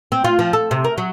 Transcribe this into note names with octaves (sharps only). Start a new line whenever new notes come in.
C4
F4
F3
A4
C3
A#4
F#3